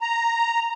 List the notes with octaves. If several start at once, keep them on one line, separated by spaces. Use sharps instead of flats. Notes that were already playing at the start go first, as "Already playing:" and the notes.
A#5